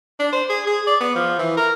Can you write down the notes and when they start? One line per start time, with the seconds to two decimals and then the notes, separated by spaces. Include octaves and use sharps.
0.19 D4
0.32 C5
0.49 G#4
0.67 G#4
0.87 D5
1.01 B3
1.15 F3
1.39 E3
1.57 A#4